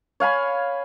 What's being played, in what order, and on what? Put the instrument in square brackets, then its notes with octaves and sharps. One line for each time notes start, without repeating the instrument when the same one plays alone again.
[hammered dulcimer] C#5 F5 G#5 B5